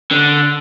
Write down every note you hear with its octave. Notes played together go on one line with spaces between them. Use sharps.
D3